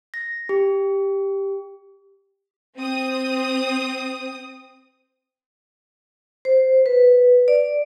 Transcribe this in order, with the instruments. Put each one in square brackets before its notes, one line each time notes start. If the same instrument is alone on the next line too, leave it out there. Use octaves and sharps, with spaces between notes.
[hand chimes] A#6
G4
[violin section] C4 D#6
[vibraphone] C5
B4
D5